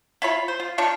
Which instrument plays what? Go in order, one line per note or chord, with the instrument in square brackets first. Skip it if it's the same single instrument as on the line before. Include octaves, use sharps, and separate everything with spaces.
[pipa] E4 F4 C#5 B5
C5
F4
D4 D#4 F4 C#5